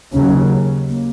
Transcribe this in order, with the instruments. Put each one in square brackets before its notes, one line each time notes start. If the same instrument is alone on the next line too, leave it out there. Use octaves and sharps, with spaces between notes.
[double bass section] D#2 C#3 F#3 [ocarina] C#4
[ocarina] A#3